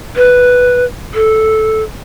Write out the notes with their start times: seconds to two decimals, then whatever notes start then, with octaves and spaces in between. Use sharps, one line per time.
0.17 B4
1.14 A4